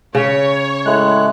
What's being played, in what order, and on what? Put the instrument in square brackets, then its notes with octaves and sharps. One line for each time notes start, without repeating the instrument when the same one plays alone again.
[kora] C#3 [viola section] C#5
[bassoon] A2 [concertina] G#3 F#6